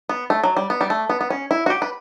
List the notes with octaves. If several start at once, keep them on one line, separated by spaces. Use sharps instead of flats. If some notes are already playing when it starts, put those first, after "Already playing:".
B3
A3
F#3
G3
B3
G3
A3
B3
B3
C#4
E4
F#4
G4
B4